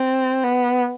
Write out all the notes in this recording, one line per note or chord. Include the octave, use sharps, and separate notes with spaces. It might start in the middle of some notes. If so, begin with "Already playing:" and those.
Already playing: C4
B3